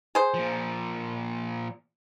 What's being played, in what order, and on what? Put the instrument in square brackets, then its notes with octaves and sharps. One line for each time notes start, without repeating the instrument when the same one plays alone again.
[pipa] G#4 C5
[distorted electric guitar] A#2 F3